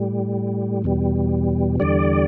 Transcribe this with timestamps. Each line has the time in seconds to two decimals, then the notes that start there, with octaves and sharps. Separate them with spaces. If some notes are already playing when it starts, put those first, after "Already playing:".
Already playing: A2 G3
0.84 E2 B2 G3
1.80 E2 D3 G3 D5